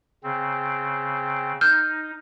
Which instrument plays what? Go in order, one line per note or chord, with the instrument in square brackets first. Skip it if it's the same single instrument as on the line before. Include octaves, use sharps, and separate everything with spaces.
[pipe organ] C#3 C4
[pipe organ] D#4 [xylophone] F6 G6